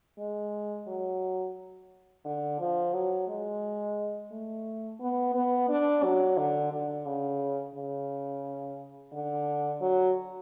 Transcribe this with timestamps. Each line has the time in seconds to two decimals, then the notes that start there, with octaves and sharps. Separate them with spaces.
0.18 G#3
0.87 F#3
2.25 D3
2.60 F3
2.93 F#3
3.28 G#3
4.31 A3
5.00 B3
5.34 B3
5.69 D4
6.03 F#3
6.37 D3
6.72 D3
7.06 C#3
7.75 C#3
9.13 D3
9.81 F#3